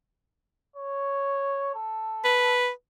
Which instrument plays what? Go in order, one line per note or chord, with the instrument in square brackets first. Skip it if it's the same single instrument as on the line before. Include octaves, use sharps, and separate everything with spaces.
[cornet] C#5
A4
[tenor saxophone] B4